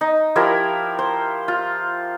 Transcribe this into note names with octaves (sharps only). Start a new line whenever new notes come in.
D#4
F3 E4 G4 A#4
C5
F4